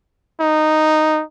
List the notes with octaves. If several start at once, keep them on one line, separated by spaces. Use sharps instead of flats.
D#4